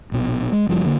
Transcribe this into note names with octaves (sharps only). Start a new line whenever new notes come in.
A#1 B2
G#3
F#1 F3 G3
D3 A#3